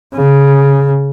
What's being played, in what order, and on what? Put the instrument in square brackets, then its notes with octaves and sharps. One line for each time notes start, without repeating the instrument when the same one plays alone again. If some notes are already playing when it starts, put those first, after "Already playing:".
[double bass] C#3